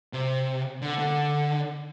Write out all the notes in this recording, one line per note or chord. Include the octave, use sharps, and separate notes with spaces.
C3
D3
D3